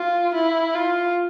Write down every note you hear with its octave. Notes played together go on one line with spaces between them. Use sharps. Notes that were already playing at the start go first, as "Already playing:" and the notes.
Already playing: F4
E4
F4